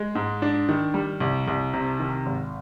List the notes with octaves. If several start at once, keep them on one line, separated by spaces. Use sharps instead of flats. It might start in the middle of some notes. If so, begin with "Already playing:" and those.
Already playing: G#3
G#2
D4
D#3
G3
C2
C2
C3
D#3
G#1